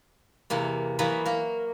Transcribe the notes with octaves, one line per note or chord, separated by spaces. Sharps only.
E2 C3 A#3
E3 F#3 A#3 B3
A#3 A#4